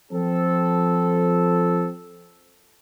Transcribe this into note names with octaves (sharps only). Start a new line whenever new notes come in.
F3 C4 A4